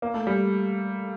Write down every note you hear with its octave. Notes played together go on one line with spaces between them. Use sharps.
A#3
A3
G3